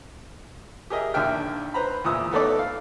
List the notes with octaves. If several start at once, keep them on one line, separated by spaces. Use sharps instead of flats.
G4 G#4 A#4 D#5 E5
A#1 D#2 D4 E5 G5 F6
B4 C5 A#5 B5
E2 A#2 D#6 E6
A3 B3 D#4 A4 D5
F5